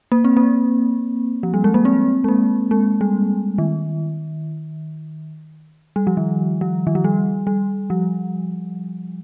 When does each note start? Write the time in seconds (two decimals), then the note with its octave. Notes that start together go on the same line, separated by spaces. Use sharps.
0.12 A#3
0.24 C4
0.37 A#3
1.43 F3
1.54 G3
1.64 G#3
1.74 A#3
1.85 C4
2.24 G#3
2.28 A#3
2.71 G#3
3.01 G3
3.58 D#3
5.96 G3
6.07 F3
6.17 D#3
6.61 F3
6.87 D#3
6.95 F3
7.04 G3
7.47 G3
7.90 F3